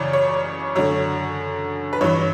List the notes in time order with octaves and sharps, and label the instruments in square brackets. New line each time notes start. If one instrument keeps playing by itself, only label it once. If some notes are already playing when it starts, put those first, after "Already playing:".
Already playing: [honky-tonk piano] F#2 C#3 E3 C#5 D5
C#5
F#2 D3 C#5
B4
G2 E3 C#5